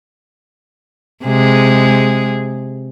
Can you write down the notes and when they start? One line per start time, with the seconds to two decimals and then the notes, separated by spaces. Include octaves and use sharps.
1.24 C3 G#3 G#4